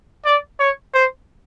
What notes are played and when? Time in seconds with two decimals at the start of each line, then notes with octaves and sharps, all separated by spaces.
0.25 D5
0.60 C#5
0.94 C5